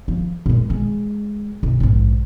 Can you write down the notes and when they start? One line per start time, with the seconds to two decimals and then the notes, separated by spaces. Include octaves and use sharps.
0.08 F3
0.46 A#2 G#3
0.70 G#3
1.63 B1 C3
1.80 A#1 G#2